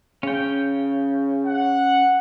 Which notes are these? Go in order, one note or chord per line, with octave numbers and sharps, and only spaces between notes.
C#3 C#4 G5
F#5